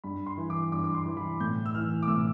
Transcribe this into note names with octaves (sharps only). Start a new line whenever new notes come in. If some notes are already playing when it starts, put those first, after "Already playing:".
G2 B5
C6
E3
D6
G2 D6
D6
C6
E3
B5
A2 G6
E6
E3 F6
D6
A2 E6